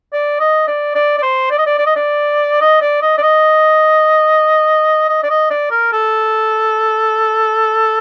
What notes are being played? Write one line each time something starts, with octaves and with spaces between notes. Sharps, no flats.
D5
D#5
D5
D5
D5
C5
D5
D#5
D5
D5
D#5
D5
D#5
D5
D#5
D5
D#5
D#5
D5
D#5
D5
A#4
A4